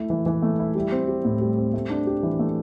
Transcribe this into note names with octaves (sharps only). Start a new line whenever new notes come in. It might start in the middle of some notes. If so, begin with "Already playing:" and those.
Already playing: A3 E4
E3
E3
A3
E4
G3
C4
G4
A2
G3
C4
A3
D4
G4
E3
A3